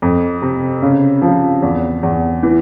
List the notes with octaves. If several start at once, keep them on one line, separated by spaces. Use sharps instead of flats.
F2
C3
C#3
F3
E2
E2
E3